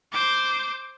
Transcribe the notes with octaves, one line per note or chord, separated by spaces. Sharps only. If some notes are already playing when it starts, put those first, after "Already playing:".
C5 D6